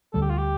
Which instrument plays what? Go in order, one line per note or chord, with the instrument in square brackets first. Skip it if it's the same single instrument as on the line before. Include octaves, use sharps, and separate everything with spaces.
[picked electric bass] D2 D3 G3 [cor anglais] A4
[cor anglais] G4
F4
G4